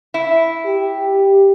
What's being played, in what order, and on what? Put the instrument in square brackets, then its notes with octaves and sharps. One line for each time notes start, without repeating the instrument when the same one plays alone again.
[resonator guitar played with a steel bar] E4
[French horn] G4